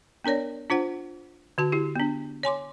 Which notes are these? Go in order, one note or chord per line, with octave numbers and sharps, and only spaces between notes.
B3 D4 A#4 C#5 D5
D4 F4 C5 F#5
D3 F#4 A5
E4 G4
B3 D4
C#5 G#5 C6 D6